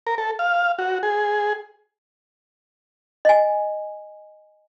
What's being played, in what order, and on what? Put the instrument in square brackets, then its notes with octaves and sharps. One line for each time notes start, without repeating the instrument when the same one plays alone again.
[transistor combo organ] A#4
A4
F5
F#4
G#4
[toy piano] D#5 G#5